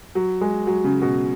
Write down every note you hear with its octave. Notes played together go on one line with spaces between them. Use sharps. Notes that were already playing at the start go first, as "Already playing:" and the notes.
F#3
G#3
F#3
C#3
B2